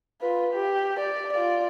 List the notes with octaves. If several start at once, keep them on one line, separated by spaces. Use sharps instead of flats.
F4 B4
G4
D5
F4 D5